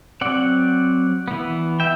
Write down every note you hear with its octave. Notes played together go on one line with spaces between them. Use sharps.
F#3 C4 D5 F#5
E3 B3
E5 G5